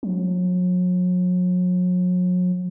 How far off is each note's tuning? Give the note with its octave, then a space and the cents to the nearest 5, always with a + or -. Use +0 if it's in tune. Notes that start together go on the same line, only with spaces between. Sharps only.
F#3 -40